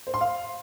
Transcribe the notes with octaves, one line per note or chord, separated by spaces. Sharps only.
C5
C6
F5